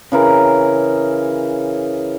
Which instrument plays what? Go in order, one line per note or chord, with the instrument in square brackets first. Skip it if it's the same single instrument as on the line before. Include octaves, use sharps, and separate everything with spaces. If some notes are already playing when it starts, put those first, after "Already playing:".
[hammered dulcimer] C#3 E3 A#4